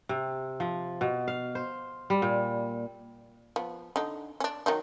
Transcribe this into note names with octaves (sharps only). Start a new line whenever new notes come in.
C3
F3
B2
F5
C5
G3
A#2
F3 B3
D3 D#4
C#4 D4
D#3 F#3 D#4